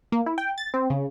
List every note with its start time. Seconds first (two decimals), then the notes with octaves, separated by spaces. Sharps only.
0.12 A#3
0.26 E4
0.38 G5
0.58 A6
0.74 C4
0.90 C#3